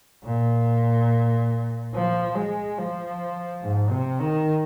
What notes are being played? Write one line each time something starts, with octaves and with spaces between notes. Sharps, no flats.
A#2
F3
G#3
F3
G#2
C3
D#3